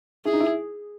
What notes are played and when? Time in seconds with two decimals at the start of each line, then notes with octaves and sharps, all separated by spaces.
0.25 E4 G#4
0.33 D#4
0.40 E4